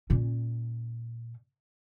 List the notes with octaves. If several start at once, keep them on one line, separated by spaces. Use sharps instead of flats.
A#2 C#4